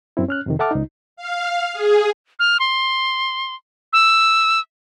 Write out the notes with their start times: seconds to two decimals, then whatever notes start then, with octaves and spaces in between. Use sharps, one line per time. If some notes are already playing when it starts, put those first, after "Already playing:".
0.17 F#2 C4 E4
0.28 C#4 F6 F#6
0.46 F2 C3 D#3
0.59 A4 E5 F#5 A5 D6 F6
0.71 C#2 D#4
1.17 F5
1.73 G#4
2.39 F6
2.60 C6
3.93 E6